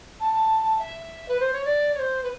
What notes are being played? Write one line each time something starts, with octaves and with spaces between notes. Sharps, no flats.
A5
E5
B4
C5
C#5
D5
C#5
C5
B4